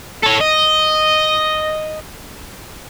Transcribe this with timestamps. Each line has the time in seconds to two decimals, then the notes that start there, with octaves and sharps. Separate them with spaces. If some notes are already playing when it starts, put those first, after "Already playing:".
0.23 A4 C#5
0.40 D#5